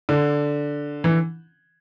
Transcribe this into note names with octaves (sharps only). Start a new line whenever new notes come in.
D3
E3